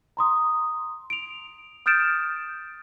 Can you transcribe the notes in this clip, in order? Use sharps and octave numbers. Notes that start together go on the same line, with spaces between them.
A#5 C6 D#6
D7 F7
D#6 F6 G6 A6 D7 E7